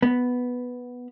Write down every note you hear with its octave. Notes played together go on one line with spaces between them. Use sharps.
B3